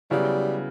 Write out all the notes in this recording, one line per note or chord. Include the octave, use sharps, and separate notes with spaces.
C#3 F#3 G3 B3 E4